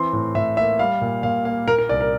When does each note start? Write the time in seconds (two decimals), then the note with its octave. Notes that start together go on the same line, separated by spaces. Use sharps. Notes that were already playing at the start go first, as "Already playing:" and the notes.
Already playing: E3 C4 C6
0.13 A2
0.35 A2 E5
0.57 A#3 E5
0.79 G3 F5
1.01 A#2
1.23 A#2 F5
1.45 A#3 F5
1.67 A#2 A#4
1.79 A#4
1.89 C2 D5
2.01 A#4